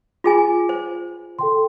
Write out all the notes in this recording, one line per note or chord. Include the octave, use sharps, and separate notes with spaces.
F4 G#4 G#5
C5
A4 G5 C6